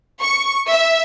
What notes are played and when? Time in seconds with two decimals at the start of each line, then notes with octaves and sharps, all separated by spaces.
0.21 C#6
0.70 E5